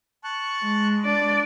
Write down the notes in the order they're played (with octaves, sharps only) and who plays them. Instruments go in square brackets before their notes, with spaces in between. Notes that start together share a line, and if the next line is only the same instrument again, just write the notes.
[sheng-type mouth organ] A5 C#6 F#6
[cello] G#3
[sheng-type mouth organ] D4 [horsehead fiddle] D5